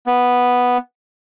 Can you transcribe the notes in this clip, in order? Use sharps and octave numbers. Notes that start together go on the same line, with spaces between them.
B3